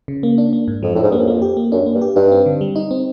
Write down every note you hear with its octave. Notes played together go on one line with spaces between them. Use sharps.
C#3
A#3
D4
A#3
G#2
F2 F3
A2 D4
G#2
G2 A#3
F#2
F2 A#3
G4
A#3
F#2 D4
A#3
G2
G4
G2 D#4
C4
D3
G3
D#4
C4